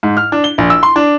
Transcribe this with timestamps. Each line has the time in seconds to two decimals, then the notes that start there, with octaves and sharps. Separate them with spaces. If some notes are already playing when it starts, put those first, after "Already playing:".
0.03 G#2
0.17 F6
0.32 D4
0.44 G7
0.58 A#1
0.70 E6
0.83 C6
0.96 D4